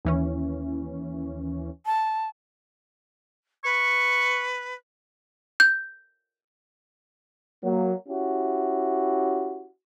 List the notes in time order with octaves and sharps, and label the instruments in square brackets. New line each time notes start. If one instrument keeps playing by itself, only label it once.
[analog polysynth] D#2 E3 C#4
[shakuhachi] A5
[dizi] B4 [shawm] C#6
[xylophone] G6
[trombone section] F#3 A#3
C#4 E4 F#4 G4